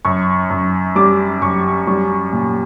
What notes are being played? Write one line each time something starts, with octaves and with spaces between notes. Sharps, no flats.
F#2 C#6
F#2
G3 D6
F#2 C#6
G3 C#6
A#2